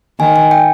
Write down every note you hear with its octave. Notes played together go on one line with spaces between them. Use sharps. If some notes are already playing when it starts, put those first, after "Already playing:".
D#3 G#5
G#5
G5